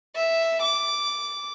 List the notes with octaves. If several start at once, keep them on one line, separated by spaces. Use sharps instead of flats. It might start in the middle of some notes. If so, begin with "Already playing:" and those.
E5
D6